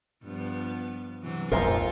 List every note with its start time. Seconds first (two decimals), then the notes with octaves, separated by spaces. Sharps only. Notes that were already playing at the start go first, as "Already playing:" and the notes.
0.24 G2 F3 B3
1.23 C3 E3 F#3
1.52 A#1 F2 G#2 F4 A4 A#4 C5